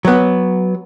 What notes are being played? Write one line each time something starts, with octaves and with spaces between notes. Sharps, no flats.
F#3 B3